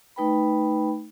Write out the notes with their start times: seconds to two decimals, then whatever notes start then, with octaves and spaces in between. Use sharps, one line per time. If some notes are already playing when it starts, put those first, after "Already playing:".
0.16 A3 D#4 B4 G5 B5